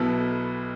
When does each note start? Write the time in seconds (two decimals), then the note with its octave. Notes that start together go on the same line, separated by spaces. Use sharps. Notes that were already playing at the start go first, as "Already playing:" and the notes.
Already playing: B1 B2 B3 E4 A4